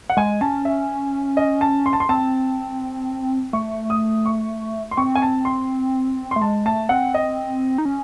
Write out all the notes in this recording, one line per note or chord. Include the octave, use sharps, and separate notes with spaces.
F#5
G#3 G#5
C#4 A5
E5
D#5
A5
C6
A5
C6
C4 A5
A3 C#6
D#6
C#6
C6
C4 C#6
G#5
A5
C6
A3 C6
G#3 A5
A3 A5
C4 F#5
D#5
D#4
C#4